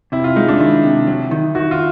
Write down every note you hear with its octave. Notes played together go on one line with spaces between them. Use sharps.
C3 E4
F4
G#3 D#4
D4
D#3 E4
C3
F#3
D#3
D#3 F#4
F4